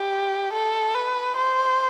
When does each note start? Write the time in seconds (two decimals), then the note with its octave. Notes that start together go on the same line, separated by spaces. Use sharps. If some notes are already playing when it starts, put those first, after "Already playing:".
Already playing: G4
0.53 A4
0.95 B4
1.37 C5